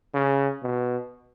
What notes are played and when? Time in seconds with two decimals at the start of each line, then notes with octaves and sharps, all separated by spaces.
0.14 C#3
0.63 B2